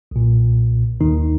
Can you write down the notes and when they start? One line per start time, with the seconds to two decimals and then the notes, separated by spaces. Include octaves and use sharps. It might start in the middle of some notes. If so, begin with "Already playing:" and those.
0.11 B1 A#2
1.00 D#2 D#3 D#4